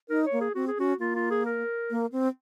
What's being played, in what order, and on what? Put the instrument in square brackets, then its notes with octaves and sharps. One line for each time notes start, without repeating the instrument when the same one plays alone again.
[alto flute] D#4 [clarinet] A#4
[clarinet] C#5
[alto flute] A#3
[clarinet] G#4
[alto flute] C4 [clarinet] F#4
[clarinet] G#4
[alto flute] C#4 [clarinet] F#4
[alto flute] A#3 [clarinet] F4
[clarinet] F4
G#4
A#4
[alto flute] A#3
C4